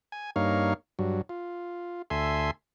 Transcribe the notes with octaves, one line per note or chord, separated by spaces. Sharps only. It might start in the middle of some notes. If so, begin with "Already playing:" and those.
G#5
G2 A#3 D#4 C#5 F5
G2 F#3
F4
D2 A4 E5 G#5 C6